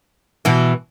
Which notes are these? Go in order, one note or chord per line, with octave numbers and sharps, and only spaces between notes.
B2 E3